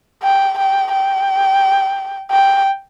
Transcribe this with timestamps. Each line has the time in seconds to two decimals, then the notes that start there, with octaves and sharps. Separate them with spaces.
0.23 G5
0.58 G5
0.92 G5
2.30 G5